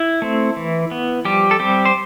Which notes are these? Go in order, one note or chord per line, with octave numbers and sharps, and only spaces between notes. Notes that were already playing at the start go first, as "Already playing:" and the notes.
Already playing: E4
A3 C4
E3
B3
F3 G3 G4
A4
G3 C4 G4
C5